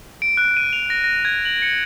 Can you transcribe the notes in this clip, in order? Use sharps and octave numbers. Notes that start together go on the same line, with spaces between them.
D7
F#6
D#7
F7
A#6
A#6
G#6
F#7
C#7